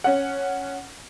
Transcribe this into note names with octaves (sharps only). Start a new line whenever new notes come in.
C#4 F#5